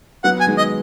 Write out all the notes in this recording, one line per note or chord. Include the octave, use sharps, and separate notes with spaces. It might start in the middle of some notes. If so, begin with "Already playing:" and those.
F#3 B3 F#5
G#5
D#3 G#3
D#5